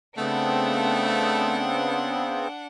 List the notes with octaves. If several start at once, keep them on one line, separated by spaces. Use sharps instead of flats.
C#3 A3 B3 C4 D4 F#5